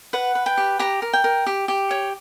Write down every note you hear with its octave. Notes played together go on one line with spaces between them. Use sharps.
B4 F#5
B4
G5
G4
G4 A#5
A#4
G5
A#4
G4
G4
C#5